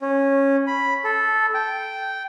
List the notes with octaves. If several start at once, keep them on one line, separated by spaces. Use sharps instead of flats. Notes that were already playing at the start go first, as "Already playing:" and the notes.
C#4
B5
A4
G5